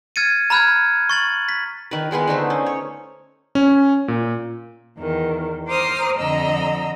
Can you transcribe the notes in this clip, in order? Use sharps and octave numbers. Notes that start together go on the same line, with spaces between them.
F6 G#6 A6 C#7 D#7
A#5 B5 F6 F#6 G#6
C#6 A6 F#7
B6
D#3 B4
D#3 G#3 B3 B4
D3 A3 D#4 C5
C#4
C#5
C#4
A#2
E2 D#3
C5 A#5 D6 D#6 F6
F2 D3 D#5 A#5 E6